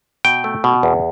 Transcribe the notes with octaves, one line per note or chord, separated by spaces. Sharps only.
B2 G5
A3
B2
E2